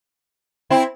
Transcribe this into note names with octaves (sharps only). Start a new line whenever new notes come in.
C4 E4